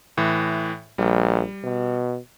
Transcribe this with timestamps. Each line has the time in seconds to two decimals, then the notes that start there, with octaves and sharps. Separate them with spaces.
0.17 A2 E3
0.98 A#1 G3
1.64 B2